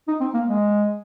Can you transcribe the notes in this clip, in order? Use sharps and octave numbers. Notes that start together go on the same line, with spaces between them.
D#4
C4
A#3
G#3